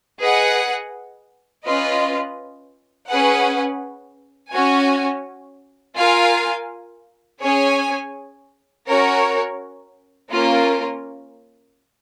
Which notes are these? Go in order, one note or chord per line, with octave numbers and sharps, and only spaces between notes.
G#4 B4 D#5 F#5
C#4 F4 B4 D#5
C#4 G#4 B4 F#5
C#4 F#4 C#5 G#5
F4 A#4 F5 G#5
C#4 G#4 C#5 G#5
C#4 F#4 A#4 C#5
A#3 C#4 F4 A#4